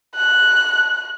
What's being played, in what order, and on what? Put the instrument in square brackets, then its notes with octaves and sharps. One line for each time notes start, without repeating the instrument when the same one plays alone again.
[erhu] F#6